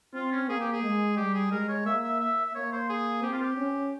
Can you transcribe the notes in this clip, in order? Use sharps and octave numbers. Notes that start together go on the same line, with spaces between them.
C4 F4
C#4
A#3 G#4
G4
G#4
G#3
G3 G4
G#4
G#3 A#4
C#5
A#3 E5
E5
E5
E5
A#3 C#5
C5
G#4
C4 G4
F4
G4
C#4